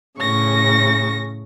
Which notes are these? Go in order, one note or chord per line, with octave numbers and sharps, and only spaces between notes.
A2 C#3 C#6 A#6